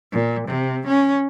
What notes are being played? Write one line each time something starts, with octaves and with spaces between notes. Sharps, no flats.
A#2
C3
C#4